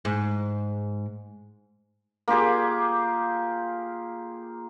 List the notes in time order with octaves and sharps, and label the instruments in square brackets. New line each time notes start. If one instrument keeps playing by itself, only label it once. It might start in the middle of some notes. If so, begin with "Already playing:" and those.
[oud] G#2
[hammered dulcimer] A#3 F4 G4 G#4